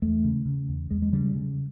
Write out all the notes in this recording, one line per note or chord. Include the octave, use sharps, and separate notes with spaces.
E2 A3
C#3
C#3
E2
E2 G#3
G#3
C#3 G3
C#3